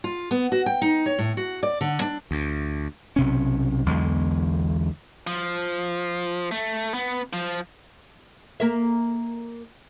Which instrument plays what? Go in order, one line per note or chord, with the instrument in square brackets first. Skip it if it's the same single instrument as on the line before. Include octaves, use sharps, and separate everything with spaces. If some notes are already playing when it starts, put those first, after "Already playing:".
[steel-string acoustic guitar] F4
B3
F#4
G5
D#4
C#5
A2
F#4
D5
D3
D4
[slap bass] D2
B1 C3 C#4
B1 E2 D3 G#3
[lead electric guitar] F3
A3
B3
F3
[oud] A#3 A#4 E5